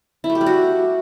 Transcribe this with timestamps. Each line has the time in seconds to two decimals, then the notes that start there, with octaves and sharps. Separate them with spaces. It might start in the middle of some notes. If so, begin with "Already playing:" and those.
0.24 E4
0.30 A3
0.35 G4
0.41 G3
0.46 F#4